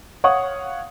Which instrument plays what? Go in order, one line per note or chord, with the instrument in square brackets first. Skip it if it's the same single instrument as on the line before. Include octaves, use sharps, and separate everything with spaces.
[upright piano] C#5 F5 F#5 C#6 D#6